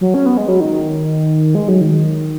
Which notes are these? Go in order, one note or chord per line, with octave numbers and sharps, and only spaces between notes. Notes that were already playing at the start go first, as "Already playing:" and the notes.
F#3
C#4
B3
G#3
F#3
D#3
G#3
F#3
D#3